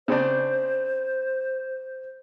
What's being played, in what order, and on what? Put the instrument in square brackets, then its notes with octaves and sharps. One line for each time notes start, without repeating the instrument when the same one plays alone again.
[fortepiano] C#3 C4 D4 [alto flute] C5